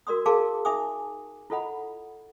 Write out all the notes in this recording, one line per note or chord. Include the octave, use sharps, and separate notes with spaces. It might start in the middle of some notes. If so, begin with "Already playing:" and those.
F#4 A#4 D5 C6 D#6
G#4 A#4 F5 A5 C6 D6
D#4 E5 G#5 D6 D#6
E4 F4 A4 D#5 F#5 B5